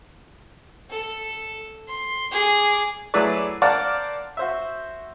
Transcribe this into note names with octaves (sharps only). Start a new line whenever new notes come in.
A4
C6
G#4 D6
F#3 A3 E4 G#4 B4 D5
A#4 C5 D5 F5 F#5 A5
F#4 C5 E5